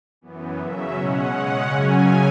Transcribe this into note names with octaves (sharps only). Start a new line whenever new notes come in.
F#2 E3 B3
C#3 F#3 C#4 E5
B2 G#3 C#4 F#5
C#3 G#3 C#4
F#2 C#3 F#3 C#4 G#5